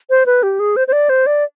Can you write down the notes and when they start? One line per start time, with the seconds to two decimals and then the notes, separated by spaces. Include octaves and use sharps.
0.10 C5
0.26 B4
0.43 G4
0.59 G#4
0.76 C5
0.88 C5
0.92 D5
1.09 C5
1.26 D5